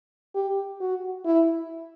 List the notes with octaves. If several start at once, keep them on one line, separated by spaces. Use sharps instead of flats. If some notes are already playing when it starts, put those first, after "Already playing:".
G4
F#4
E4